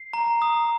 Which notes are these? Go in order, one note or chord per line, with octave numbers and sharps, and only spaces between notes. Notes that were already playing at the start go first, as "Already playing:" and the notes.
Already playing: C7
A#5
D#6